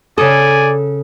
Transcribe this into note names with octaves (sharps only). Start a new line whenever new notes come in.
C#3 A4 D5 G#5 D#6